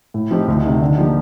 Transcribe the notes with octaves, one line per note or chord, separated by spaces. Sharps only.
A2
F3 C4 D#4 G4
D2
C3 D#3
D3
F3 A#3 D#4 G4